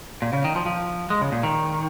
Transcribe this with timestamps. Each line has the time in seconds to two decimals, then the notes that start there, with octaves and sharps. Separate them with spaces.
0.22 A#2
0.33 C#3
0.44 D#3
0.56 F3
0.66 F3
1.10 G#3
1.21 C#3
1.32 A#2
1.43 D#3